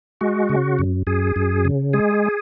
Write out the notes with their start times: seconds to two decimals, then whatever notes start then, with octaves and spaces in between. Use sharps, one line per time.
0.21 G#3 F#4
0.49 C#3
0.79 F#2
1.07 F#2 G#4
1.36 F#2
1.65 C#3
1.93 G#3 G#4